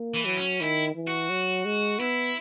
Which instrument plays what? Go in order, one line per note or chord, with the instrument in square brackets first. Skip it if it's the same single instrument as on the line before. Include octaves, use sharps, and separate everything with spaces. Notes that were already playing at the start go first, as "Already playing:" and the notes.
Already playing: [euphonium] A#3
[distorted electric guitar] E3
[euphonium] F#3
[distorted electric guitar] C#4
[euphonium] D#3 [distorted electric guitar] E4
[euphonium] E3
[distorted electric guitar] F#4
[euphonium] F#3
G#3
[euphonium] B3 [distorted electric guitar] E4